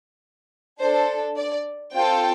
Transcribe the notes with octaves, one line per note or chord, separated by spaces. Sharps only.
D4 A4 C5
D5
C4 F4 A4 G5